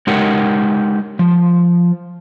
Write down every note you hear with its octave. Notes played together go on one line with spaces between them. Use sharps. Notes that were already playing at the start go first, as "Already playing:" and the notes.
G#3 D#4 G4 A#4 F#5
F3